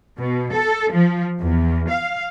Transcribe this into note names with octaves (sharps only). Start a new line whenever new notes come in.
B2
A4
F3
E2
F5